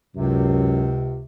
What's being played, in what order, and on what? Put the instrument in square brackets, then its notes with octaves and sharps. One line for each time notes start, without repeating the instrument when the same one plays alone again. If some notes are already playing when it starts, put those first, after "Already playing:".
[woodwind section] C#2 C3 [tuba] F#2